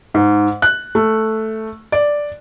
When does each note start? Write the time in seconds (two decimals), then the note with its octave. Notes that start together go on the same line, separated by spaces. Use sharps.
0.14 G#2
0.62 F#6
0.95 A3
1.92 D5